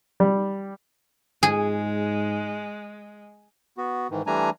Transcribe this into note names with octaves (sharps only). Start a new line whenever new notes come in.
G3
G#2 G#3 G#4
B3 F#4
G#2 D#3 E3
E3 G3 A3 D4 G#5 A#5